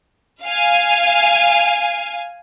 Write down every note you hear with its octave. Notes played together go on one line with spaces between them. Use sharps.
F5 G#5